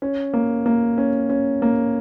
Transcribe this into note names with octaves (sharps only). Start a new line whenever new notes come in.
C#4
A#3
A#3
C#4
C#4
A#3